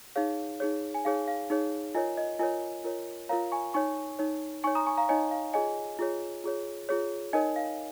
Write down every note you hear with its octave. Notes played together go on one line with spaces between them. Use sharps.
D#4 G#4 C#5 F5
D#4 G#4 C#5
G#5
D#4 G#4 C#5 F5
F5
D#4 G#4 C#5
F4 A#4 C#5 D#5 G#5
D#5
F4 A#4 C#5 D#5 G#5
F4 A#4 C#5
F4 A#4 C#5 F5 A#5
G#5 C#6
D#4 C#5 G#5 C#6
D#4 C#5
D#4 C#5 G#5 C#6
A#5 D#6
G#5 C#6
F5 A#5
D#4 C#5 D#5 G#5
F5
F4 G#4 C#5 D#5 G#5
F4 G#4 C#5
F4 G#4 C#5
F4 G#4 C#5
D#4 A#4 C#5 D#5 G#5
F5